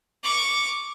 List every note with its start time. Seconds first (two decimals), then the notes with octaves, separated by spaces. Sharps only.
0.23 C#6 D6